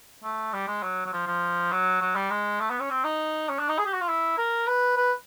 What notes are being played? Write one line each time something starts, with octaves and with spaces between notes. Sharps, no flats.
A3
G3
G#3
F#3
F#3
F3
F3
F#3
F#3
G3
G#3
A3
B3
C#4
C4
D#4
C#4
D4
D#4
G#4
G4
F#4
F4
E4
A#4
B4
B4